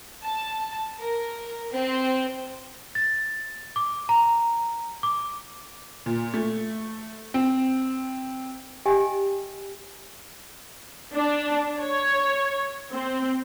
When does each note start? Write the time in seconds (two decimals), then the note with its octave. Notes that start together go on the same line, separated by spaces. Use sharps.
0.22 A5
0.98 A#4
1.71 C4
2.95 A6
3.76 D6
4.09 A#5
5.03 D6
6.06 A#2
6.34 A3
7.34 C4
8.86 G4 D#5 E5 G5 G#5
11.14 D4
11.81 C#5
12.92 C4